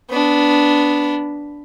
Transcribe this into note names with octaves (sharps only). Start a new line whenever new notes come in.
B3 D4